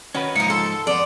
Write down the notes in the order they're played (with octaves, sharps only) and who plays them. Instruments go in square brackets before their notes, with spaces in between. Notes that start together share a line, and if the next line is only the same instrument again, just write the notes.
[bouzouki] D#3 [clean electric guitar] C#4 F#4 B4
[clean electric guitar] G#2 F3 [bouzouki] A#3 D#4 [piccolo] C#7
[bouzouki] A4 [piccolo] C6
[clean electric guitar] F2 B3 [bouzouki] D5